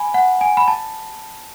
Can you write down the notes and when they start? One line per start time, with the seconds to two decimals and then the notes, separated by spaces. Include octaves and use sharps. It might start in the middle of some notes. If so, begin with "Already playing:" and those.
Already playing: G#5 B5
0.14 F#5
0.41 G#5
0.57 B5
0.68 A5